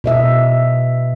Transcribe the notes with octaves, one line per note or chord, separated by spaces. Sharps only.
B2 D#5 E5